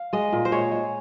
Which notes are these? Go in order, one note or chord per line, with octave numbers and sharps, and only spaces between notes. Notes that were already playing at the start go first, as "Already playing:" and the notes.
Already playing: F5
G#3 D#5
A#2
C5
G#3 C#5
G#3